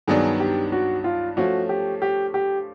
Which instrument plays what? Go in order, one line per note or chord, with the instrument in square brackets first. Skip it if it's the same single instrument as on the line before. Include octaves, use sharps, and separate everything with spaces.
[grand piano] G2 D#3 F#3 B3 D4 [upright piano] G#4
[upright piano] G4
F#4
F4
[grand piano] F3 A3 C#4 [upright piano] F#4
[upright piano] G4
G4
G4